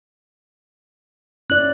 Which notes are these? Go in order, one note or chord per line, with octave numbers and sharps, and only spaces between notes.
C#4 E4 D5 F#6